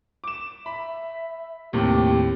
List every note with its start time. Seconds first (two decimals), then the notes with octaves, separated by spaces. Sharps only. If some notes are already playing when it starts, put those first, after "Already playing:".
0.24 D6 E7
0.66 E5 B5
1.73 D#2 A2 C3 G4